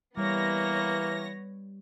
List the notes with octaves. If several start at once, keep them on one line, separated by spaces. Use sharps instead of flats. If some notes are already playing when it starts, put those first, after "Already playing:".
E3 G3 A#3 B3 C#5 A#6